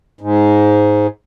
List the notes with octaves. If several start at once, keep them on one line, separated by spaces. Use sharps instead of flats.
G#2